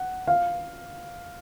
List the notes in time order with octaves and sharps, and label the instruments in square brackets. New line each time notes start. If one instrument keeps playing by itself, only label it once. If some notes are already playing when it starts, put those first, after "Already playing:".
Already playing: [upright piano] F#5
F5